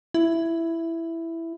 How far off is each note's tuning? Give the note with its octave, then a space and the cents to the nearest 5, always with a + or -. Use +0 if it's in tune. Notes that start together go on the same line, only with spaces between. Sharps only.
E4 +5